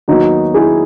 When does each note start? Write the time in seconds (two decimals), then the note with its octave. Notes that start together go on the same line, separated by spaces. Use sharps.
0.08 D#2 D#3 F#3 B3 D#4 F#4
0.54 E4 G#4